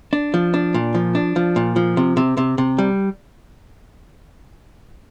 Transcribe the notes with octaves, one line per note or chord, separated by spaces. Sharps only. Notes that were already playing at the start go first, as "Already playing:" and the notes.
D4
F3
D4
A#2
F3
D4
F3
A#2
F3
C3
C3
C3
C3
G3